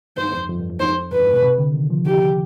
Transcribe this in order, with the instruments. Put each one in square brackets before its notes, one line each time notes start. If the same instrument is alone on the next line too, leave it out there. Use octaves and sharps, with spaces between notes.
[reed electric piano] G2 [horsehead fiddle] C5
[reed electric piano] F2
F2
G2
F2
[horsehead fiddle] C5
[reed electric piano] G2 [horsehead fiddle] B4
[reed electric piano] G#2
B2
C3
D3
D#3
F3
[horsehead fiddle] G4